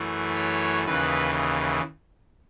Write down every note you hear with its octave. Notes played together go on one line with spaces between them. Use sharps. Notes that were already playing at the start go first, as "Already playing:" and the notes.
Already playing: F#2 E3 A3
C#5
D#2 C#3 E3 B4